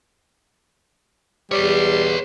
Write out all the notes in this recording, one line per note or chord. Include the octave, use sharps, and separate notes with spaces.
E2 G3 B4 C#5